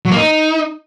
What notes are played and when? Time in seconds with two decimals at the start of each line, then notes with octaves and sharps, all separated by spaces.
0.05 F#3
0.11 A#3
0.16 D#4